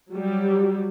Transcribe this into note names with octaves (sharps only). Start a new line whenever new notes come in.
F#3 G3 G4